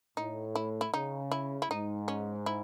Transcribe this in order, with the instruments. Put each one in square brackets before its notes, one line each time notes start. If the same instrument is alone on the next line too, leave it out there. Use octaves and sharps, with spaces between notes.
[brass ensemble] A2 [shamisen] D#4
[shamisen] E4
E4
[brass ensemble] C#3 [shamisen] D#4
[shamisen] E4
E4
[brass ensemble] G#2 [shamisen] D#4
[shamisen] C#4
E4